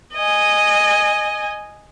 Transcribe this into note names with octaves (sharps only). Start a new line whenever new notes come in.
D#5 G#5